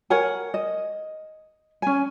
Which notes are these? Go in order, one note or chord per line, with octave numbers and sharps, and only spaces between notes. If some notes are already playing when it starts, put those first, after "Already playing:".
A#4 C#5 F#5 G#5
D#5
C#4 G#5